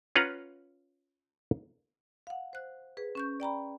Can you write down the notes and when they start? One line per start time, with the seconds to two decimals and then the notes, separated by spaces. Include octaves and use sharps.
0.16 C#4 F4 B4 F5 F#5 A#5
2.27 F5 F#5
2.53 C5 F#6
2.97 G#4 B4
3.15 C#4 C#6 G6
3.40 D5 G5 A#5 B5